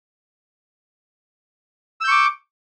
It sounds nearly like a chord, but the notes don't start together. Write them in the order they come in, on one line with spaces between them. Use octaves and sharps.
E6 G6 C#6 D6